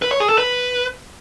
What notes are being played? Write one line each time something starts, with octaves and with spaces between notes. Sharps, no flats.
B4
C#5
G#4
A4
B4